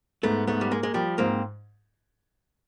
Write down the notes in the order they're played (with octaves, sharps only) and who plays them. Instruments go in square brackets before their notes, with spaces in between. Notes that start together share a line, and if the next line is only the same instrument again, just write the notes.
[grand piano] G#2 [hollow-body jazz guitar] A3 B3
[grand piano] G#2 [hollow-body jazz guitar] A3 B3
[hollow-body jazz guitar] G3
[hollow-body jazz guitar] G#3 [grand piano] A#3
[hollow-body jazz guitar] G#3
[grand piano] F3 [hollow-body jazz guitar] G3
[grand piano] G#2 [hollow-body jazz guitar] A#3 C4